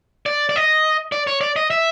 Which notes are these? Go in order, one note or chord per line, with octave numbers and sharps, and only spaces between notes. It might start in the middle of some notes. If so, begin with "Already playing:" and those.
D5
D5
D#5
D5
C#5
D5
D#5
E5